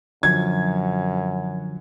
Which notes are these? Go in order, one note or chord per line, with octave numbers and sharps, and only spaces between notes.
F#2 D3 F3 F#3 G#6